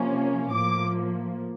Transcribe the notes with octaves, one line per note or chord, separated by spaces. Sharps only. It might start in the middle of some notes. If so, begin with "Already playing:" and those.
Already playing: C3 F3 A#3 C#4
A2 F3 A#3 D6